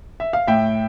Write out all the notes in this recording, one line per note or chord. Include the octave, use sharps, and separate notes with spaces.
E5
F5
A2 E5 G5